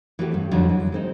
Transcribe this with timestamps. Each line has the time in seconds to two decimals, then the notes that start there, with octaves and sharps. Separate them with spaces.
0.19 E3 A3 C4 F#4 G4
0.32 G2 D4
0.51 F2 D3 F3 F#3 D#4 F4
0.69 E3
0.92 G#3 C4 D#4